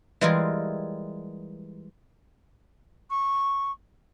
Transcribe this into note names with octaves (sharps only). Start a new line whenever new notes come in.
E3 G3 G#3 F4 G#4 A#4
C#6